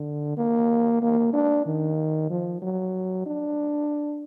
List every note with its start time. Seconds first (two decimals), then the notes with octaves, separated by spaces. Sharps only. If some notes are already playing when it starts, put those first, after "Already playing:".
Already playing: D3
0.37 A#3
1.02 A#3
1.33 D4
1.66 D#3
2.30 F3
2.62 F#3
3.26 D4